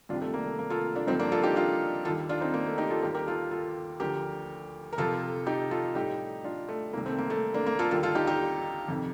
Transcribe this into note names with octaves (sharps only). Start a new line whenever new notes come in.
C2 C3 D#3 G3 D4 F4
A3
A#3
A3
A#3
F4 A4
D4 F4
G2 D3 F3 C4 D#4
A#3 D4
F4 A4
D#4 G4
D4 F4
D#2 D#3 G3 F4 A4
D4 F4
C4 D#4
A#3
A3
D#4 G4
F4 A4
D#2 D#3 G3 G4 A#4
G4 A#4
F4 A4
F4 A4
D2 D3 F3 G4 A#4
A#4
F2 C3 F3 F4 A4
D#4 G4
F4 A4
A2 G3 D#4 G4
D4 F4
A3
C2 C3 D#3 A#3
A3 C4
A#3
A3
A#3 D4
A#3
F4 A4
D#2 D3 G3 F4 A4
F4 A4
D#4 G4
D#4 G4
F2 C3 D#3